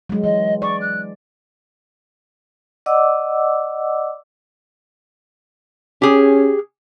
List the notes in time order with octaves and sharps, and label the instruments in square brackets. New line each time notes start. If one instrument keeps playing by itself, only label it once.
[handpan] F#3 G#3
[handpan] E3 [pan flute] D#5
[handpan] D5 [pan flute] C#6
[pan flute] F#6
[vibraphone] D5 D#5 F#5 D6 E6
[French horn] C#4 [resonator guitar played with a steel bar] G4 G#4